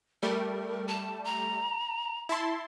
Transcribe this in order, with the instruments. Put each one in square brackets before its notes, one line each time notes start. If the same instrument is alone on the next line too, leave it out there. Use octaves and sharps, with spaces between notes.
[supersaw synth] G3 A3 [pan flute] A#4
[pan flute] A5
A#5
[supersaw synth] E4 A5 C6